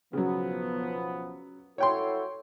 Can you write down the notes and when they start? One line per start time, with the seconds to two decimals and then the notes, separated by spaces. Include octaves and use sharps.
0.13 B1 C#3 F3 F#3 B3
1.78 E4 F#4 A4 C#5 G5 C6